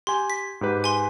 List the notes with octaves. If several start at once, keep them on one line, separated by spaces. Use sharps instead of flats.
G4 G#5 C6
B6
G#2 G4 B4
G#5 C6